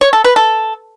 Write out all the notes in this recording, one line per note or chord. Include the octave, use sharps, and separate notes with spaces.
C#5
A4
B4
A4